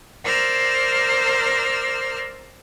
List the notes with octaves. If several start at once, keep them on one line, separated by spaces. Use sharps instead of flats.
A#4 C5 D5 E6 F6